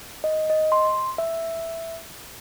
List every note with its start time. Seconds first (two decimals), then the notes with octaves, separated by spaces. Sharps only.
0.24 D#5
0.50 D#5
0.72 C6
1.18 E5